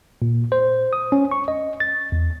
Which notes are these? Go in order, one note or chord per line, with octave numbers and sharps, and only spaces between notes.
A#2
C5
D#6
C#4
C#6
D#5
A6
E2